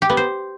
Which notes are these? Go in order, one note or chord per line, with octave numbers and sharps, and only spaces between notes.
G4
B3
C5